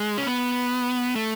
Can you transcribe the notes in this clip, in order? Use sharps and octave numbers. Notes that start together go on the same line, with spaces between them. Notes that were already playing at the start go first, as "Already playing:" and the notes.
Already playing: G#3
C#4
B3
A3